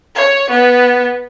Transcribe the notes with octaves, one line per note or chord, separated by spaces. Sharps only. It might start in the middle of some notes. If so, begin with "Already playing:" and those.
C#5
B3